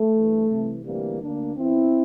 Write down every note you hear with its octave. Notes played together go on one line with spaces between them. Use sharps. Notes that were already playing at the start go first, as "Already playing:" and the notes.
Already playing: A3
G2 E3
C2 C3 E3
D2 C3 E3 G3 A#3
D2 D3 A#3 D4
E2 E3 C4 E4